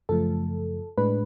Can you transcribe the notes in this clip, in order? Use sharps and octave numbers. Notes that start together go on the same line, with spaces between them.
F#2 C#3 F3 A3 A4
A2 G#3 D4 B4